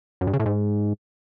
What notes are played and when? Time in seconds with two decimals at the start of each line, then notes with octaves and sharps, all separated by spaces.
0.21 F#2
0.27 G2
0.33 C#3
0.40 A2
0.46 G#2